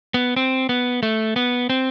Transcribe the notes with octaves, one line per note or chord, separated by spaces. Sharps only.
B3
C4
B3
A3
B3
C4